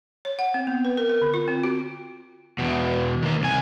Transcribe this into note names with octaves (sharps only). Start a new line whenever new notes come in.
C#5
F#5
C4
B3
B4
A#4
A#4
D3
F4
C4
F#4
E2 B2
D#3 A#3
C2 G#5